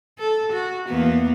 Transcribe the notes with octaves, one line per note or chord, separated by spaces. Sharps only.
A4
F#4
E2 A#3 B3